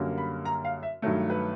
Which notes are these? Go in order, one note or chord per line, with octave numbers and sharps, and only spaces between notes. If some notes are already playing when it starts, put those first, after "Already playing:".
Already playing: F#2 D3 G3 A#3 C#4
B5
A#5
F5
E5
G2 D#3 F#3 A3
B4